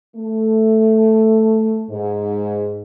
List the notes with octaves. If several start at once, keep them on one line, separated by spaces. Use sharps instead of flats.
A3
G#2